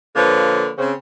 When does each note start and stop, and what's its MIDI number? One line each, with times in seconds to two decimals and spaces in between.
0.16 0.69 50
0.16 0.69 53
0.16 0.69 58
0.16 0.69 71
0.16 0.69 73
0.78 0.92 49
0.78 0.92 60